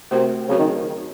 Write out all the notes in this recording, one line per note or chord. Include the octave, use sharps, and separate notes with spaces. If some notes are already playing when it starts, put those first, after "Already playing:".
C3 A3 C4 F#4 A#4
C#3 F#3 C4 F#4 A#4
D#3